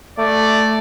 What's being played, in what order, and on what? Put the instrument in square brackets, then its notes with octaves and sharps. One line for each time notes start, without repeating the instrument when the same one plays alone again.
[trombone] A3 [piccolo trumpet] D5